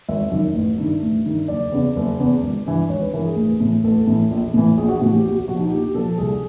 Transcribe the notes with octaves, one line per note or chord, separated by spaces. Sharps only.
G#1 E5
F#2 D#3
A1
G2 D#3
A1
G2 D#3
F#1 D5
E2 C#3
F#1
E2 C#3
G#1
G2 E3
G#1 C#5
B4
G2 E3 A#4
G#4
A1
A2 E3
A1 A4
A2 E3
A#1
A2 E3
A#1 G#4
F#4
A2 E3 F#4
G4
A#1 G4
F#4
A#2 F3 F#4
D#4
A#1 G4
A#2 F3 A4
C2 G#4